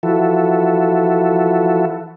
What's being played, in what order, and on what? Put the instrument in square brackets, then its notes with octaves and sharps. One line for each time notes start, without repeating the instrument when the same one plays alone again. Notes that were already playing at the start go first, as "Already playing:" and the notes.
[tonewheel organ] E3 F3 E4 F#4 A4